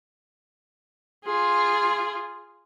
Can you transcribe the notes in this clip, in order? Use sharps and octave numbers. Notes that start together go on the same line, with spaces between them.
F4 G#4